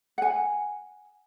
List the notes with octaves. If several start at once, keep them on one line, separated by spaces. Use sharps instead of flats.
F#5 G#5